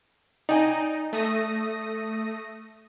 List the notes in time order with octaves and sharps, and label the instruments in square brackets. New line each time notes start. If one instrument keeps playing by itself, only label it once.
[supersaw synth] D#4 [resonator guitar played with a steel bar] D5 G5 G#5
[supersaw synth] A3 D#6 A#6